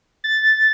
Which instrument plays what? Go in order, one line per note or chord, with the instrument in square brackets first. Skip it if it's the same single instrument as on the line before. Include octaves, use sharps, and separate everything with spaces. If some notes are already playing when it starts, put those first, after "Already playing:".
[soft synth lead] A6